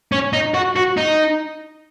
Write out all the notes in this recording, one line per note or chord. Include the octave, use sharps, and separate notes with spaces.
C#4
D#4
F#4
F#4
D#4